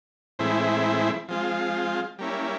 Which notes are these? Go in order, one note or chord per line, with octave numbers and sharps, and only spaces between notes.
A2 E3 G#3 C4 E4
F3 G#3 C4 F4
G3 A#3 C#4 E4